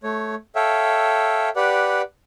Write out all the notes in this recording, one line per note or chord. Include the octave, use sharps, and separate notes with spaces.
A3 C#5
A4 C#5 E5 F5 G5
G4 B4 D5 F#5